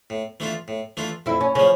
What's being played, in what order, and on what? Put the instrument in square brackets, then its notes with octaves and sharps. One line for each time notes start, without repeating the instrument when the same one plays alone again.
[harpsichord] A2
E3 A3 D4 F4
A2
E3 A3 D4 F4
[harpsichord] F2 [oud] E4
[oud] C#4
[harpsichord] C#3 F3 [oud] C#4